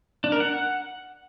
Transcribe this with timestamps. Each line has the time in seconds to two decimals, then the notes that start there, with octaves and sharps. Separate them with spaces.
0.24 D4
0.32 A#4
0.40 F#5